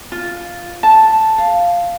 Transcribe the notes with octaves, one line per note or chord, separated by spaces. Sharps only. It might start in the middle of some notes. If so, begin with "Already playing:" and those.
F4
A5
F5